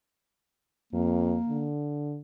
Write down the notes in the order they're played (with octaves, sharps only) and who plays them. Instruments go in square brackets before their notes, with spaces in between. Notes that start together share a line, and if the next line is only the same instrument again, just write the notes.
[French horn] F2 [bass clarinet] A#3
[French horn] D3